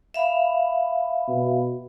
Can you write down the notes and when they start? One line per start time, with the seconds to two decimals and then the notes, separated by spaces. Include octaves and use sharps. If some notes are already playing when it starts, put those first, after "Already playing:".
0.14 E5 F5 B5
1.28 B2